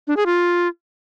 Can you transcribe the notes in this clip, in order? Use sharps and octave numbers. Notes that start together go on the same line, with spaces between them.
D4
G#4
F4